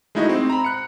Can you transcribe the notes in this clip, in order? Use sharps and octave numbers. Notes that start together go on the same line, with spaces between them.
G#3 A3 D#4 E4 F#4 D#5
C4
A#5 B5
F#6 C#7